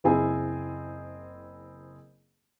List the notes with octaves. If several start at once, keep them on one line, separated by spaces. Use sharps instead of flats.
F#1 C4 E4 G#4 G#5